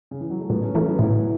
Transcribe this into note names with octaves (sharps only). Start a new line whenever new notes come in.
C#3
E3
F#3
A3
A2 F#3 B3
A3 C#4
E3 A3 C#4
F#3 B3
A2 B3 E4